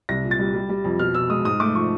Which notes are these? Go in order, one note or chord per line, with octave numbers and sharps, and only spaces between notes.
C2 A#6
A#2
A6
G3
G3
G3
F2
B2 F6
B2 E6
G#3 D#6
G#2 D#6
A3 D6
F3 C#6